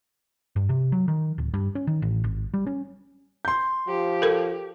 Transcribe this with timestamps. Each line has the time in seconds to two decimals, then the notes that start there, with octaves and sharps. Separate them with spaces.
0.56 G2
0.69 C3
0.92 F#3
1.08 D#3
1.38 D1
1.54 G2
1.75 C#4
1.87 D#3
2.02 A1
2.24 G#1
2.54 G3
2.67 C#4
3.45 C6 G6
3.88 F3 G4
4.22 A4 A#4